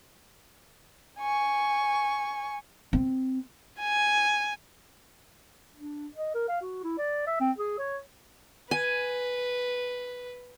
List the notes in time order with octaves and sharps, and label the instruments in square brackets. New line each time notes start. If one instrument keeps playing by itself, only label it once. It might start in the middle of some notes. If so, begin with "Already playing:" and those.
[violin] G#5 C#6
[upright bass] C4
[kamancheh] G#5
[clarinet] D4
D#5
A#4
F5
F#4
E4
D5
E5
C4
G#4
C#5
[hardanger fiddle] B4 [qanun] G#5